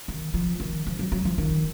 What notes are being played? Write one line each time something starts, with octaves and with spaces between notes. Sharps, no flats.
D#3
F3
D#3
F3
F#3
F#3
F3
D#3